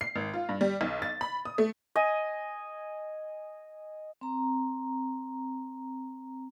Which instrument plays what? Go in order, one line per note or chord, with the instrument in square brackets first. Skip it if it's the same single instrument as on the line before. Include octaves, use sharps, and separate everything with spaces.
[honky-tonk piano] C7
G#1
F4
G2
G3
B1
A6
B5
D#6
A3
[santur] D#5 G#5
[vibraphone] C4 A#5